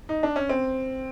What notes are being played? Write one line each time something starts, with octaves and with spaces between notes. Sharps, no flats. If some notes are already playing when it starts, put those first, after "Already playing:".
D#4
D4
C#4
C4